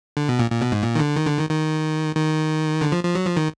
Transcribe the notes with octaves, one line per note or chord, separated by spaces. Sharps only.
D3
B2
A#2
A#2
B2
G#2
A#2
D#3
D3
D#3
D3
D#3
D#3
D#3
D3
F3
F3
F#3
F3
D#3